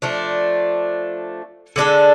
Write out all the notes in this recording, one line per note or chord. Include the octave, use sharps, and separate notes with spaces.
F3 A3 D4
D3 G#3 D4 A4